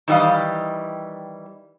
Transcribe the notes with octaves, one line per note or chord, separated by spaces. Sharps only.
D#3 E3 G3 D#5 F5